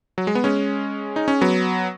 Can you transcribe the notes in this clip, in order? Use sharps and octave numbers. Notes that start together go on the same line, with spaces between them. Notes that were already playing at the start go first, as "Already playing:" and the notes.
F#3
G#3
B3
G#3 C#4
D#4
C#4
F#3 B3